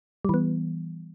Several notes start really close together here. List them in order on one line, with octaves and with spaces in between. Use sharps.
G3 E3 B3